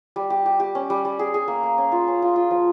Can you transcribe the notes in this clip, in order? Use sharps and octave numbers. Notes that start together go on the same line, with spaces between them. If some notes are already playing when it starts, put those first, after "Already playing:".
G3
G4
G4
G4
C#4
G3
G3
G#4
G#4
A#3
A#3
C#4
F4
C#4
F4
F4
F3